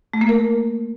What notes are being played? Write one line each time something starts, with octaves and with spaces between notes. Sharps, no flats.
A3
A#3
A#4